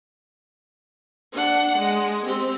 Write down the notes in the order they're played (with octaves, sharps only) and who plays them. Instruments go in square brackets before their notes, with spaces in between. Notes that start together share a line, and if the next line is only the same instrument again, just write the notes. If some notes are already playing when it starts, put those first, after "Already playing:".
[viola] D4 F#5
G#3
C4 G4